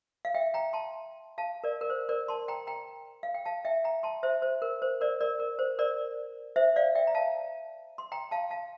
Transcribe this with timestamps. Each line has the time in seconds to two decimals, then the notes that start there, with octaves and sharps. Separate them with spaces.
0.25 F5
0.35 E5 G5
0.54 G5 A#5
0.73 A5 C6
1.38 F5 A5
1.64 A#4 D5
1.81 A#4
1.90 C5
2.09 A#4 D5
2.28 A5 C6
2.48 G5 A#5
2.67 G5 A#5
3.23 F5
3.34 G5
3.46 F5 A5
3.65 E5 G5
3.84 G5 A#5
4.03 A5 C6
4.23 C5 E5
4.42 C5
4.62 A#4
4.82 C5
5.01 A#4 D5
5.21 A#4 D5
5.39 A#4
5.59 C5
5.79 A#4 D5
6.56 C5 E5
6.76 D5 F5
6.95 E5 G5
7.07 A#5
7.15 F5 A5
7.98 C6
8.12 G5 A#5
8.31 F5 A5
8.50 F5 A5